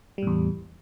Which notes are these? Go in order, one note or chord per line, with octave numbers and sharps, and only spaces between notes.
E2 A2 G3